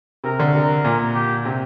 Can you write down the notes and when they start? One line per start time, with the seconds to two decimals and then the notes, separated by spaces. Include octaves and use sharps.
0.24 C3 A#4
0.39 D3
0.54 C3 A#4
0.85 A#2
1.15 G4
1.45 C3